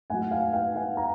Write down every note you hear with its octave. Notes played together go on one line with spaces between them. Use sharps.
A2 F#3 F#5 G#5
F5 G5
F5 G5
F#5 G#5
G#5 A#5